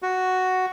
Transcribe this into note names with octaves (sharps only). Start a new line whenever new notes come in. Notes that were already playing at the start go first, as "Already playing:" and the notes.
F#4